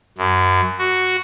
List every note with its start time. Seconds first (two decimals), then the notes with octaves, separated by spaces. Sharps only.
0.18 F#2
0.79 F#4